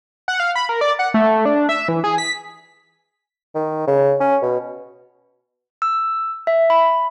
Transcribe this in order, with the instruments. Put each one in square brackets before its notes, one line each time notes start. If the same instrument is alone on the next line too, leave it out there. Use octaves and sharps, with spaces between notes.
[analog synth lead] F#5
F5
B5
A#4
D5
F#5
A3
D4
E5
E3
G#4
B6
[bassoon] D#3
C#3
C#4
B2
[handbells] E6
E5
B5